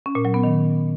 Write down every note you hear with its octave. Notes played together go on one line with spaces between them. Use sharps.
C#4
A#2
F#3
B3
D#3